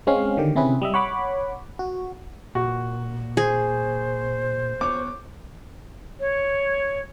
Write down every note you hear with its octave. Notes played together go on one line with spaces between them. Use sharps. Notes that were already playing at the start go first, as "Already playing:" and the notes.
G#3 C4 C#4 F5
D3 D#3 G4
C3 C4 C#4 E4 G#4 B4
G3 D#5 E5
C#5 F#5 B5 D6
F#4
A#2 F#4
G#4 C5
B3 C#5 D6
C#5